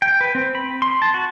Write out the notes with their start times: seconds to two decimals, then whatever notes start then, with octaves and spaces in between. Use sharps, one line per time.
0.02 G5
0.21 B4
0.35 C4
0.55 B5
0.82 C6
1.02 A5
1.14 F#4